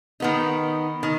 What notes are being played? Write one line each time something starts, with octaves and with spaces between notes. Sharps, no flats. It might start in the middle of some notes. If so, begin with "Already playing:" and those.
D#3 B3 D#4
D#3